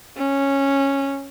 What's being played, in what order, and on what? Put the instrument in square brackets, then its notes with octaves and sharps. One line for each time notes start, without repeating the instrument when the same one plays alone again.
[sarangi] C#4